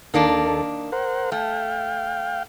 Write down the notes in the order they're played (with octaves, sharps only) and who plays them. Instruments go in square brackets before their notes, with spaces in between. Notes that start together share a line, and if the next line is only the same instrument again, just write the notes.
[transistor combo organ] D#2 A4 [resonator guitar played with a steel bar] D#3 A#3 D4
[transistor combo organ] A#4 C5 F#5
[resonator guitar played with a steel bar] A3 [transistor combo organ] F5 G5